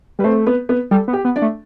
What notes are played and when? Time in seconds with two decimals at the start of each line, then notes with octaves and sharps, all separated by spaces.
0.19 G3 B4
0.24 A3 C4 C5
0.46 B3 B4
0.69 B3 B4
0.91 G3 A4
1.08 B3
1.13 G4
1.25 B3
1.36 D4 D5
1.42 A3